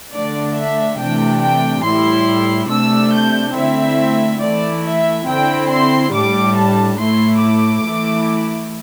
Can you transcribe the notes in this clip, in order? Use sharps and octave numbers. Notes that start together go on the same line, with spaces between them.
D3 A3 D4 D5
E5
C3 E3 A3 D4 G5
G5
A2 G3 E4 C6
C3 A3 D4 E6
G6
D3 A3 C4 E4 E5
E3 A3 E4 D5
E5
D3 C4 E4 G5
C6
A2 G3 D4 D6
A5
A2 A3 E4 C6
D6
E3 A3 E4